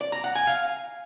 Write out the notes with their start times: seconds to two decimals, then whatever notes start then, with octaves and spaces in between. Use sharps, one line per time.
0.01 D5
0.12 A#5
0.24 F#5
0.35 G#5
0.47 F5